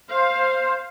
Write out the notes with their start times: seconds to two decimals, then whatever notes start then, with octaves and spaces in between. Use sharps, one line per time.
0.10 C5 F5